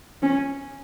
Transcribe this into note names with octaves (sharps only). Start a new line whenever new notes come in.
C#4